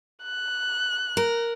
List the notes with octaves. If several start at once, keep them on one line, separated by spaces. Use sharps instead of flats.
F#6
A#4